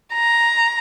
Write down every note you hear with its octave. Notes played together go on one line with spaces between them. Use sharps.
A#5